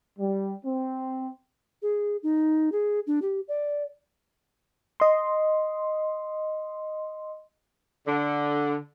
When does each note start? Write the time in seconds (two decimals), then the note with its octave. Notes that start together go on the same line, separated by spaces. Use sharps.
0.19 G3
0.65 C4
1.82 G#4
2.23 D#4
2.72 G#4
3.07 D4
3.22 G4
3.48 D5
5.00 D#5 C6
8.06 D3